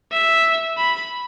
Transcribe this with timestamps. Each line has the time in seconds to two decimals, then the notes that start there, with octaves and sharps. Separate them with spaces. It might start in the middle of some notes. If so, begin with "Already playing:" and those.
0.11 E5
0.77 B5